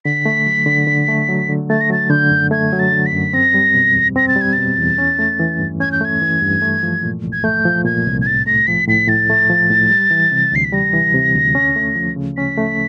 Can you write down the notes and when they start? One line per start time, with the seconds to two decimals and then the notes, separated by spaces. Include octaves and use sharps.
0.05 D3 B6
0.26 A3
0.46 F#3
0.66 D3
0.87 D3
1.08 A3
1.28 F#3
1.49 D3
1.70 A3 A6
1.81 A#6
1.90 F#3 A6
2.10 D3 G6
2.30 F#2
2.51 A3 G#6
2.73 F#3
2.79 A6
2.93 D3
3.06 B6
3.13 F#2
3.33 C4 A#6
3.54 G3
3.74 B2
3.95 E2
4.16 C4 A#6
4.28 A6
4.36 G3
4.41 G#6
4.53 B2 A6
4.78 E2
4.98 C#4
5.19 A3
5.40 E3
5.59 G2
5.80 C#4 G#6
5.92 G6
6.01 A3 G#6
6.22 E3
6.42 G2
6.62 A3
6.83 F3
7.03 A#2
7.24 C2
7.32 G#6
7.44 A3 G6
7.65 F3
7.85 A#2 G#6
8.06 C2
8.21 G#6
8.26 A2 A6
8.46 A3 A#6
8.67 F3 B6
8.88 A2 B6
9.08 A2 A6
9.30 A3
9.49 F3
9.70 A2
9.90 G3
10.11 E3
10.32 C3
10.52 D2 C7
10.64 B6
10.73 G3 A#6
10.93 E3
11.14 C3
11.35 D2
11.55 C#4
11.76 A3
11.95 F3
12.16 C#3
12.37 C#4 B6
12.57 A3